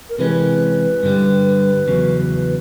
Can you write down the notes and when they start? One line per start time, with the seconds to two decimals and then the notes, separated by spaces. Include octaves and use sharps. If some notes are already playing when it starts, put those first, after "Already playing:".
0.10 A#4
0.18 C3 E3 G#3 C#4 B4
1.03 G2 D3 G3
1.87 E2 C#3 F#3